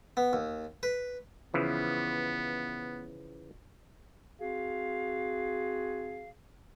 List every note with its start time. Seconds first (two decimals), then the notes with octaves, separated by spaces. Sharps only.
0.17 B3
0.33 D#2
0.83 B4
1.54 C#3 E3 F3 B3
4.39 C4 F#4 G#4 F5